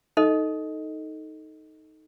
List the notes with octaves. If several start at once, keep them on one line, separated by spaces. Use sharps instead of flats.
D#4 A4 D#5